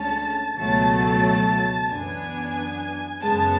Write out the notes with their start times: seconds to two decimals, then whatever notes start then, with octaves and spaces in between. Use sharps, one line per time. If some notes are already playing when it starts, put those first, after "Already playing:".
Already playing: D2 D3 G#3 C#4 A5
0.56 C#2 B2 F#3 A3 A5
1.89 F#2 E3 B3 D4 G#5
3.22 F#2 C#3 G#3 B3 A5